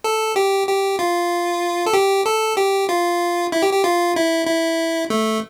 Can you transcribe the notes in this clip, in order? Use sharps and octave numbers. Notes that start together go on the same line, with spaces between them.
A4
G4
G4
F4
A4
G4
A4
G4
F4
E4
G4
G4
F4
E4
E4
A3